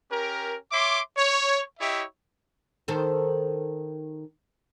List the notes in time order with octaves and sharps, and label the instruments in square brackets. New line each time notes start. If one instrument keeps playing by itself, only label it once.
[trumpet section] C#4 G4 A#4
C#5 E5 C6 D6
C#5
E4 G4 C#5 D#5 E5
[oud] D#3 A4 C5